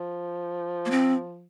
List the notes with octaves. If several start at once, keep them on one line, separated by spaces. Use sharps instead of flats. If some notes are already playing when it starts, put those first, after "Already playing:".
Already playing: F3
A#3
C4